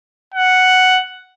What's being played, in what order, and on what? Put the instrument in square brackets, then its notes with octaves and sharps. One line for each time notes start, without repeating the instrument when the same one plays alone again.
[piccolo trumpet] F#5